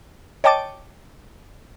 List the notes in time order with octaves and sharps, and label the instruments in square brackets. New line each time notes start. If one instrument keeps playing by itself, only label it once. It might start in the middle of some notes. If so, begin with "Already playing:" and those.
[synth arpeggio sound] C#5 D#5 G5 A5 D6 A6